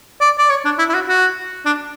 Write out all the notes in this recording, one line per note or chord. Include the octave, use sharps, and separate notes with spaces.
D5
D5
C#5
D4
E4
E4
F#4
F#4
D4